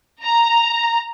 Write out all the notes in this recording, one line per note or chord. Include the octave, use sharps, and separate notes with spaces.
A#5